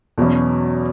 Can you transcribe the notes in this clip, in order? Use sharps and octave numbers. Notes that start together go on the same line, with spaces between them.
E2 B2 F#3 C#4